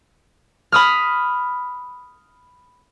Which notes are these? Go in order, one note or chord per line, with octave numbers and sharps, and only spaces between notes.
B5 D#6 F6